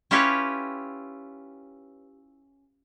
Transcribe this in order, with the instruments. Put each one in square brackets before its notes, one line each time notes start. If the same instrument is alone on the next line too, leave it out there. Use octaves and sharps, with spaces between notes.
[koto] C#4 E4 F4 G4 B4 C#5